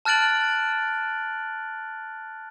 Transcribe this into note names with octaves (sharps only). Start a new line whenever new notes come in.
A5 F6 F#6 A6 D7 F#7